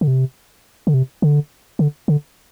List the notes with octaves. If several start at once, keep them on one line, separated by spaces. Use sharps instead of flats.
D3
C3
D3
C3
D3
D3
D3